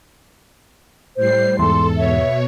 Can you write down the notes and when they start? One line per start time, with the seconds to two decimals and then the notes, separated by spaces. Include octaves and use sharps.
1.16 A2 G3 C5 C7
1.59 E2 G#2 A4 C6
1.97 B2 C#5 E5